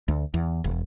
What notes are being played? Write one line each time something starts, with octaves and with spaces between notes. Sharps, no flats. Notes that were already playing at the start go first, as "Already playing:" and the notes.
D2
E2
E1